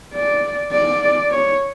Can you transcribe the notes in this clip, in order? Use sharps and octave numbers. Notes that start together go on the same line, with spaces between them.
D5
D5
C#5